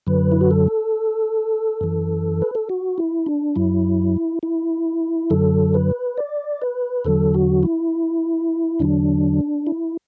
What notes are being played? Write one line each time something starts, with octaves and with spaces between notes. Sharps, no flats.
F#2 D3 F#3 B4
E4
F#4
A4
F#2 E3
B4
A4
F#4
E4
D4
F#2 F#3 E4
E4
F#2 D3 F#3 A4
B4
D5
B4
E2 D3 F#3 A4
F#4
E4
E2 D3 F#3 D4
E4